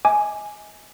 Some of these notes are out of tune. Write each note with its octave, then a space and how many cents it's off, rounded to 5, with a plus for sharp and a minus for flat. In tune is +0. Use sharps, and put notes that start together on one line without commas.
D#5 +35 G#5 +5 D6 +5